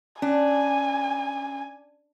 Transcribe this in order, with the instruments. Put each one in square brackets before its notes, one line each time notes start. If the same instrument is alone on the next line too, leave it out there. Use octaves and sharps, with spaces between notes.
[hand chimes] C#4 [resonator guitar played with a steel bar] D4 [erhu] G#5